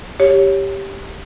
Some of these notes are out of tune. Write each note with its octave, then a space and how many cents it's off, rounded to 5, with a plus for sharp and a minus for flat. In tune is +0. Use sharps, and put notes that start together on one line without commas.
G4 +0 C#5 +0